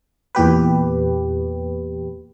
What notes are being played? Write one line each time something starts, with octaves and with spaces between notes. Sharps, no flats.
E2 A#2 G4 B4